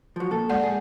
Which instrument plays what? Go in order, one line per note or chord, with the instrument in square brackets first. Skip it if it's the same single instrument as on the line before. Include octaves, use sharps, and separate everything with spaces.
[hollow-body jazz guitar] F3 F#3
A#2 A4
[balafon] G#3 D5 F#5
[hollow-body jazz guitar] G#4